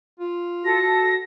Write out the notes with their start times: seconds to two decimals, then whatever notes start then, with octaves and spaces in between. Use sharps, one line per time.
0.20 F4
0.64 F#4 A4 A#6